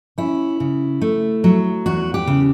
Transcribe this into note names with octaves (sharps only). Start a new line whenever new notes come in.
C#4 E4
C#3
A3
F#3
E2 F#4
G4
C#3